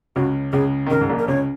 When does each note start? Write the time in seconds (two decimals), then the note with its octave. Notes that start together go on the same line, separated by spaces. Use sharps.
0.16 C#2 C#3 F#4
0.52 C#2 C#3 G#4
0.86 D#3
0.90 C#2 C#3 A#4
1.01 G#2
1.09 A#1 A#2
1.19 A#4
1.28 C#2 C#3 C#5